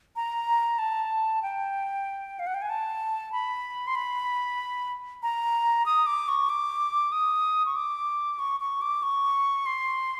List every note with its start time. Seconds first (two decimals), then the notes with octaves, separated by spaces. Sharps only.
0.16 A#5
0.79 A5
1.42 G5
2.39 F5
2.47 F#5
2.54 G5
2.62 G#5
2.70 A5
3.32 B5
3.87 C6
3.95 B5
5.23 A#5
5.86 D#6
6.06 D6
6.28 C#6
6.49 D6
7.12 D#6
7.66 C#6
7.76 D6
8.39 C#6
8.60 C#6
8.81 D6
9.03 C#6
9.66 C6